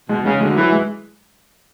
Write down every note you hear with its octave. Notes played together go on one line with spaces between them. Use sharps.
B2 G#3
C#3 G#3
D2 G#3
E3 F#3
G#3